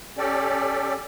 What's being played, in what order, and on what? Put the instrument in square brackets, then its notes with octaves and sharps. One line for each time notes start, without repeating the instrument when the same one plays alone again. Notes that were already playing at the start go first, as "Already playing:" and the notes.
[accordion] C#4 G4 A4 D5